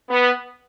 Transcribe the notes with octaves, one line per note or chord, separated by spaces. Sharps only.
B3